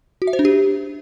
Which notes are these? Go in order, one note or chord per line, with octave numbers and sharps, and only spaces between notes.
F#4
E5
C5
D4
G4